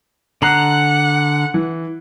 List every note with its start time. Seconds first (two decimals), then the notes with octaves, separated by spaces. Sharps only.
0.42 D3 F#5 A#5 F#6 C7 F#7
1.54 E3